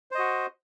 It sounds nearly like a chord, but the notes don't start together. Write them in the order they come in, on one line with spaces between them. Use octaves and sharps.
C5 D#5 F#4